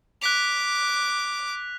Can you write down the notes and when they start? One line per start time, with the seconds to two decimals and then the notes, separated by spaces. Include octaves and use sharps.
0.22 D6 F#6 B6 F7